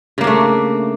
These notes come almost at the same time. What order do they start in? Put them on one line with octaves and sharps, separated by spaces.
C#3 A#3 D4 A3